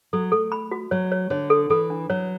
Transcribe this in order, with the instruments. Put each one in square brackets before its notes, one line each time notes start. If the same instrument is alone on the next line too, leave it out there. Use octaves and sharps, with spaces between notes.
[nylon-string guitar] F#3 [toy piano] A4
[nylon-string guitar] A3 [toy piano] A4
[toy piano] B5
F#4
[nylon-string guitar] F#3 [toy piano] C#5
[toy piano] C#5
[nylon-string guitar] D3 [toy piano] C#5
[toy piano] A4
[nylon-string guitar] E3 [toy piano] A4
[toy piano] D4
[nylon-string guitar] F#3 [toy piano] C#5